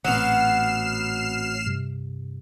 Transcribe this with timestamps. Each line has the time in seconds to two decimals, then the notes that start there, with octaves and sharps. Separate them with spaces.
0.04 A1 A#2 F#3 B3 C4 F6 C7 E7
1.66 G2 C3